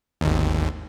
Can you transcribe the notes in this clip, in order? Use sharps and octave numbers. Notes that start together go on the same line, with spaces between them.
G#1 D#2